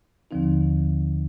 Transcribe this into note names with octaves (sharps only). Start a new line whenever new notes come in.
D#2 D3 F3 C4 D#4